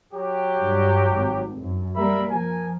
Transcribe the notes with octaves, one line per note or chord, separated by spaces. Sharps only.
F#3 G4
G2 G3
G#1
F#2
G3 A#3 A#4 E5 B5
F3 A#4 G#5